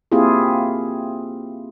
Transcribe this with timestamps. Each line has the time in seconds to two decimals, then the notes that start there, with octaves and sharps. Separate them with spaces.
0.12 A#3 C4 E4 F4 G4 G#4